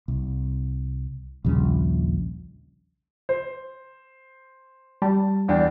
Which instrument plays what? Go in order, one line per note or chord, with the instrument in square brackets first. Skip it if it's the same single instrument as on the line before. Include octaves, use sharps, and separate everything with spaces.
[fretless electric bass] C2
A#1 D#2 C#3 G3
[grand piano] C5
[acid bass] G3 [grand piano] A5
[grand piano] E2 D4 G5